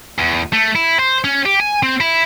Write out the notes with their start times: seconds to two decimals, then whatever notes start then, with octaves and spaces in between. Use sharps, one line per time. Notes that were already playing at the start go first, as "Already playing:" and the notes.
0.18 E2
0.53 A3
0.76 E4
1.00 C5
1.24 C#4
1.45 G4
1.60 G#5
1.83 C4
2.01 E4